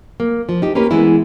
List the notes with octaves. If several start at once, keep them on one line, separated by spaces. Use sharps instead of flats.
A#3
F3
D#4 G4
A#3 C#4 G4 B4
E3 G#3 B3 E4